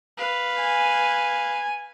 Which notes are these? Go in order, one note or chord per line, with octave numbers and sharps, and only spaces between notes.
B4 F5
G#5